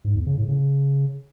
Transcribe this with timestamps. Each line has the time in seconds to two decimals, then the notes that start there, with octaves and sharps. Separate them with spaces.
0.05 G#2
0.16 E2
0.27 C#3
0.38 A2
0.49 C#3